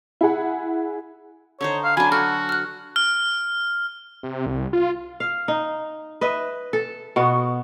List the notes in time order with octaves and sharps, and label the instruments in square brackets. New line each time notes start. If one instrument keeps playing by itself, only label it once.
[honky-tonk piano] E4 G#4 F#5
[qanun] D3 D#4 C5 [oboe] C#5
[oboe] F5
[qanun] F#3 D4 [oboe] G#5 [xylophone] B5
[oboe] F#4 [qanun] A4 [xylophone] F6
[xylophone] F6 F#6
[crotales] F6
[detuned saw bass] C3
C2
F4
[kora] F5
D#4
B4 D#5 E5
A4
B2 B3 F#4